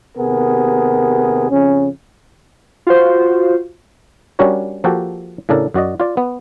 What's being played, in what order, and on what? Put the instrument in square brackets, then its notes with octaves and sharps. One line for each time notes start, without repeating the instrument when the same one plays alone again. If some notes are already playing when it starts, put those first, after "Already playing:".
[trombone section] D#2 C3 B3 G#4 A#4
F2 C#3 C#4
[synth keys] F4 F#4 C5
[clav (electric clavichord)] G3 C#4 D4 F#4 A#4 C#5
F3 A#3 F#4 G4 A4
A2 C#3 D4 A4 A#4
F#2 F#4 D5 D#5
F4 D5
B3